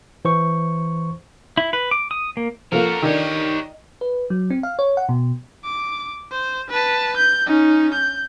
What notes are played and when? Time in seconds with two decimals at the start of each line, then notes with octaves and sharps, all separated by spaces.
0.25 E3 C5 C#6
1.57 E4
1.73 B4
1.91 D6
2.11 D#6
2.37 A#3
2.72 F3 A#3 F4 F#4 A4 A#4 C5
3.02 D#3 D4 G4 C#5 D#5
4.01 B4
4.30 F#3
4.50 C4
4.63 F5
4.79 C#5
4.97 F#5
5.09 B2
5.65 D6
6.32 C5
6.70 B4 A5
7.17 G6
7.46 C#4 D#4
7.94 G6